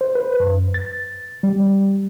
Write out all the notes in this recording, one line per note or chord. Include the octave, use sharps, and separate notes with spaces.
C5
B4
F#2
A6
G3